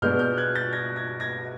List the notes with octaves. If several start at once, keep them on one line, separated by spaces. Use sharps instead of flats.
B2 G#3 B3 D4 F6 G6
F6 G6
F#6 G#6
G6 A6
G#6 A#6
G#6 A#6
G#6 A#6